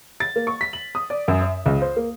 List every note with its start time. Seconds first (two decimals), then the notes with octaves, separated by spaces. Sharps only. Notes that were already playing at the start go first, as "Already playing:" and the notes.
0.20 A6
0.36 A#3
0.47 C#6
0.61 B6
0.73 F#7
0.95 D#6
1.10 D5
1.28 F#2
1.41 E5
1.66 C#2
1.82 C5
1.97 A#3